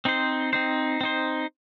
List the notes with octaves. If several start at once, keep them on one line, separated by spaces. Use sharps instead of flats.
C4 D#4 C5
C4 D#4 C5
C4 D#4 C5